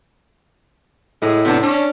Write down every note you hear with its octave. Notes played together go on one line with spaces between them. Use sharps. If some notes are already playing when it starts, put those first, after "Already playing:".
A2 G#3
C3 B3 D4
C#4 D4